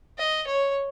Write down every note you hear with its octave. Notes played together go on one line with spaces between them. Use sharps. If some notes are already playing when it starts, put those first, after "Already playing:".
D#5
C#5